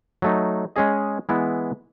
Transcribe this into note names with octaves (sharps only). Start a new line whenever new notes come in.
F#3 A3 D#4
G#3 C#4 G#4 D#5
E3 G#3 B3 E4